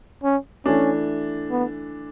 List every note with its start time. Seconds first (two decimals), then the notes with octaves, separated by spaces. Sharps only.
0.24 C#4
0.66 E3 A3 C#4 D4
1.51 B3